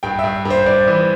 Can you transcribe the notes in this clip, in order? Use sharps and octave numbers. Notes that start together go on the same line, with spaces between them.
G2 G5
E5
G2
G2
C5
G2 D5
E3